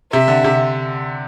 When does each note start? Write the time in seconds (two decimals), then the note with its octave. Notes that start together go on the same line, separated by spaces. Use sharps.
0.13 C3 E5
0.28 D3
0.44 C3